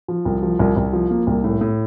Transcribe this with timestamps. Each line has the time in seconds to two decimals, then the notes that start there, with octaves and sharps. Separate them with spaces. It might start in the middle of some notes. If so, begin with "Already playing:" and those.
0.08 F3
0.25 C2
0.43 F3
0.59 C2
0.76 C2
0.93 F3
1.11 A#3
1.27 C2
1.44 A2
1.61 A2